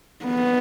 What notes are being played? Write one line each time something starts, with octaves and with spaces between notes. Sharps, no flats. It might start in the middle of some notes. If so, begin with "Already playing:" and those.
B3